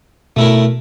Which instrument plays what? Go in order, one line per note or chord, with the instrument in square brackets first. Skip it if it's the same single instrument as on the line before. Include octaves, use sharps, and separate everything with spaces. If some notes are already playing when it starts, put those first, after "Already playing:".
[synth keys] B2 [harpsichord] A3 E4 A#4